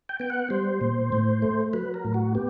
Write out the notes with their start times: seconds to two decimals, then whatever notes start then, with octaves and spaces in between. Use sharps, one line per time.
0.09 G5
0.20 B3 G5
0.30 F#5
0.50 G3 C5
0.81 A#2
1.12 A2
1.42 A3
1.73 F#3 B4
1.94 A#4
2.05 A2
2.14 F#4
2.35 B3 G4